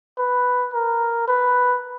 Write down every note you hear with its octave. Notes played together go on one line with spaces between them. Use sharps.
B4
A#4
B4